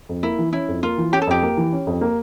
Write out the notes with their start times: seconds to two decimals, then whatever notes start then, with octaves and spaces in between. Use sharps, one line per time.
0.09 F2
0.23 A#3 E4
0.38 E3
0.53 C#4 E4
0.68 F2
0.83 A#3 F4
0.98 E3
1.12 C#4 G4
1.22 A4
1.27 F2 G4
1.42 A#3
1.57 E3
1.73 C#4
1.87 F2
2.01 A#3